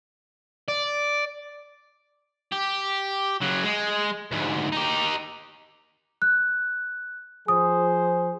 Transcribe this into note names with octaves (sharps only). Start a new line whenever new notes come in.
D5
G4
C#3 F#3
G#3
D2 G#2
D#4 G4
F#6
F3 G#4 C5 D#6